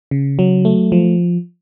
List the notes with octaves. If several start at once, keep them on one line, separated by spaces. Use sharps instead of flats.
C#3
F#3
A3
F3